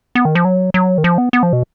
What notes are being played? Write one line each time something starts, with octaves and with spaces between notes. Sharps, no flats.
B3
D#3
F3
F#3
F#3
D#3
F3
B3
B3
F3
B2